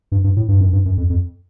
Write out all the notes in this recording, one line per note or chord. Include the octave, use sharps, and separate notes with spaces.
G2
G2
A2
G2
F#2
G2
F#2
F2
F2